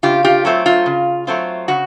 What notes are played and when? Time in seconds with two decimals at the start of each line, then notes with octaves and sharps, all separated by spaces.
0.03 C#3 F4 G4
0.24 F4 G4
0.45 F#3 A3 C4 F4
0.66 F4
0.86 C#3
1.27 F#3 A3 C4 F4
1.68 C#3 F#4